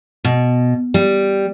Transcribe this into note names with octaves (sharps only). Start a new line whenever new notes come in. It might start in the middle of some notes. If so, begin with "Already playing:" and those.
B2
G3